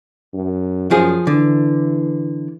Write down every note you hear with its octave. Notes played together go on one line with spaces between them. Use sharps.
F#2
F#2 F3 G#4
D3 E3